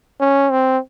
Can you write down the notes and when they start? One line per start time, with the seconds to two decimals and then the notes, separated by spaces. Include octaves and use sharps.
0.20 C#4
0.51 C4